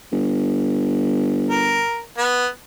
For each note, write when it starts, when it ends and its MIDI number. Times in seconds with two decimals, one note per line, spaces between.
0.12 1.86 31
1.49 2.02 70
2.18 2.46 59